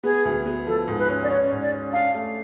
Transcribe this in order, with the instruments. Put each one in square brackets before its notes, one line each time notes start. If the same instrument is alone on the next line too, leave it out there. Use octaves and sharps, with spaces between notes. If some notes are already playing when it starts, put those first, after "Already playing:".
[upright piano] B3 [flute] G#4
[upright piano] D2
B3
[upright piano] F3 [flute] A4
[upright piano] G#2
[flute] B4
[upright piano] C#4
[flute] D5
[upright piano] C#4 [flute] C#5
[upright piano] G#2
[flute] D5
[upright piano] C#4
[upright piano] D4 [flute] F5
[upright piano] A3